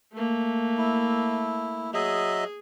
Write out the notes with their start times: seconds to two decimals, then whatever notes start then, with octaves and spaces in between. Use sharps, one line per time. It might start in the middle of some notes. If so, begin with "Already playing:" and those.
0.13 A3 A#3
0.78 E4
1.94 F#3 G#4 D#5 E5